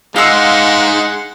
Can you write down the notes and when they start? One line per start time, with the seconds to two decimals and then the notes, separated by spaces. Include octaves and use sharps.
0.16 G#3 D#4 C5 F5 F#5 E6